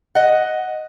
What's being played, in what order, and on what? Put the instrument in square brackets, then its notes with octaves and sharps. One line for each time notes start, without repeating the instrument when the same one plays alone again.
[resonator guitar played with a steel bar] D#5 F#5